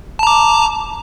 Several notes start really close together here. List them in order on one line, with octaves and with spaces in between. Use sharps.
A5 A#5 D6